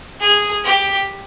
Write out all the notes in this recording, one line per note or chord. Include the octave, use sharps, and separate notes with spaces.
G#4
G4